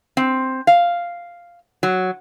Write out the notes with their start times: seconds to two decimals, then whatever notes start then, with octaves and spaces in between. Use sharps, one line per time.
0.17 C4
0.67 F5
1.83 F#3